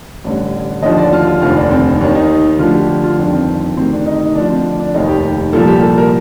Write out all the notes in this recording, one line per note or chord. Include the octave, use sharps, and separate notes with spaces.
A1 G2 D3
D#2 D3 F3 D#5
D5
F4
F4
F1 D#2 D3 F4
D4
C4
D#2 D#3 D4
D#4
D2 D3 F3 F4
G4
G4
F4
G1 F2 D#3 D4
C4
D2 C3 D#3 C4
D4
D#4
D#4
D2 D3 F3 D4
C4
D4
F1 D#2 D#3 D#4
G4
C2 A#2 F3 A4
G4
A4
A#4